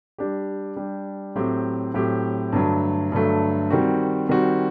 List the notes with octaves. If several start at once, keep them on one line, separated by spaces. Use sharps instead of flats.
G3 D4 G4
G3 D4 G4
A2 F#3 C4 G4
A2 F#3 C4 G4
G2 D3 F#3 A3
G2 D3 F#3 A3
D#3 G3 C4 F#4
D#3 G3 C4 F#4